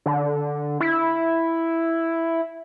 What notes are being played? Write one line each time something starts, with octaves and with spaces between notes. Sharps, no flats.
D3
E4